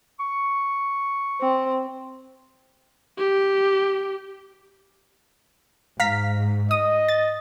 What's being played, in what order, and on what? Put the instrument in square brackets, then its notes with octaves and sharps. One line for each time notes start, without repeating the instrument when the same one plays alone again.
[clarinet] C#6
[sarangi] C4
[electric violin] G4
[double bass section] G#2 [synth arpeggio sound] F5 A#5 B6
[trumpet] D#5 [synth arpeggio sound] D#6
[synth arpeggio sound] A6